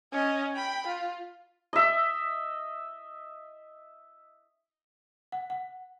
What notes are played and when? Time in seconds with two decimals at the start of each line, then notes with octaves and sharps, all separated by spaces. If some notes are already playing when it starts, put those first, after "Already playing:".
0.12 C#4 D#5
0.54 G5 B5
0.87 F4
1.73 D#5 E5
5.32 F#5
5.50 F#5